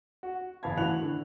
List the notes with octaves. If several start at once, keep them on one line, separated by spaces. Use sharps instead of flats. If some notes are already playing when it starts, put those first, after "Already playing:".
F#4
F#1 E2 F5 A5 B5 G#6
A2 E3 F#4 F#6 F7 F#7
D3